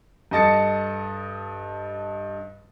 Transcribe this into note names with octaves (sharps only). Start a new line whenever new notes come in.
G2 A4 D#5 A5 A6 C#7